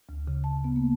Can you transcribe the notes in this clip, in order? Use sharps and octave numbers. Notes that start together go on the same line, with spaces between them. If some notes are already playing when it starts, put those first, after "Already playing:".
D2
C#3
A5
B3
A#3